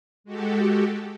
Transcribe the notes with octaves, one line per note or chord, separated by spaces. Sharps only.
G#3 F#4 G4 A4